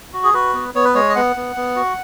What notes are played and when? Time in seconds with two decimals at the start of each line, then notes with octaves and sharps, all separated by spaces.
0.13 F#4
0.24 G#4
0.34 F#4 B4
0.54 B3
0.74 B3 C#5
0.85 B4
0.94 G#3 C#5
1.09 D#5
1.15 B3 F#5
1.36 B3
1.56 B3
1.76 F#4